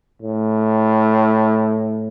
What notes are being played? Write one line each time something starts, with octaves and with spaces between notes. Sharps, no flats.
A2